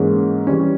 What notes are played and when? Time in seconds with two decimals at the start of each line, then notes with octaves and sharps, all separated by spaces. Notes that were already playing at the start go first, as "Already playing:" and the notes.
Already playing: G#2 E3 A#3 C#4 G#4
0.47 E3 G3 C#4